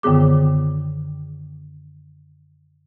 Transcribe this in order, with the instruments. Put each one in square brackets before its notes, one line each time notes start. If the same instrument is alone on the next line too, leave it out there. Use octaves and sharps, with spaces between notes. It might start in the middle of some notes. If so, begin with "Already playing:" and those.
[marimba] F#2 D3 D#3 B3 G#4 D6